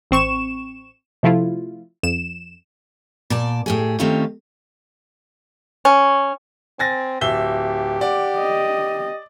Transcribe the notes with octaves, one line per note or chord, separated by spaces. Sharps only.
A1 C4 C#6 E7
C3 F3 A3 E4 F4
F2 E7
A#2 D5 A5
A2 G4 G#4
D#3 A3 C4 C#4 F4 G4
C#4
C4 G#5 A6 A#6
D1 G4 E5 G7
D5 F#5
D#5